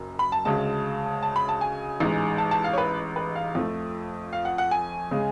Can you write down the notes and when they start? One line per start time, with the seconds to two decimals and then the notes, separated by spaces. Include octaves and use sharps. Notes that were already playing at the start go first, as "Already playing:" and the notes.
Already playing: F#1 F#2
0.19 B5
0.32 A5
0.45 D2 C#3 G#3 A5
1.23 A5
1.36 B5
1.49 A5
1.61 G#5
2.00 A1 G#2 G#3
2.38 A5
2.51 A5
2.64 F5
2.73 C#5
2.78 B4
3.16 B4
3.35 F5
3.55 F2 F3 A3
4.33 F5
4.45 F#5
4.58 F#5
4.71 G#5
5.11 C#3 G#3